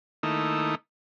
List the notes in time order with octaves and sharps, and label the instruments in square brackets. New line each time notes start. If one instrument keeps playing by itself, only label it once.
[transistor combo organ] D#3 A3 A#3 D#4 E4